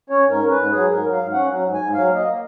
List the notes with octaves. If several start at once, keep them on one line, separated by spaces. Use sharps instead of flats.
C#4 C#5
G#2
A#4
C#4
B4
G#2
F#3 G#4
G#2 A#4
F#3
G#2 F5
C#4 F#5
F#3
G#2
G#5
G#2
F#3 F5
A#3
D#5
A#3